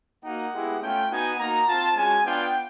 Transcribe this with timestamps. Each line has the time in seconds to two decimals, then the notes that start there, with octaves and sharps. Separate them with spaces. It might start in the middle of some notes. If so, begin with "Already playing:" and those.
0.24 A#3 D#4 F#4 F#5
0.53 G#3 B3 E4 G4
0.81 A3 C#4 F4 G5
1.10 B3 D#4 F#4 G#5
1.38 A#3 D#4 F#4 A#5
1.67 C4 F4 A5
1.95 G#3 C#4 F#4 G#5
2.25 B3 D4 F4 G5